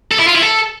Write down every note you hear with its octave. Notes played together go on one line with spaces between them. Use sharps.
A4
E4
F4
E4
A4